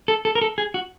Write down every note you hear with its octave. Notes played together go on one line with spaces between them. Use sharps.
A4
A4
A#4
A4
G#4
F#4